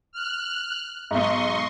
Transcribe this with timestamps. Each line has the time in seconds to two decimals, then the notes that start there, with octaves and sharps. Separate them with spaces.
0.12 F6 F#6
1.11 B1 G#2 D#5 C6 C#6